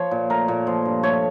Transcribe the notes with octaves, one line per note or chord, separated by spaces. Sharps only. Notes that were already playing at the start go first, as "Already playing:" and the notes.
Already playing: F3 C#5
A#2
A3 A#4
A#2
F3
G2
A3 C#5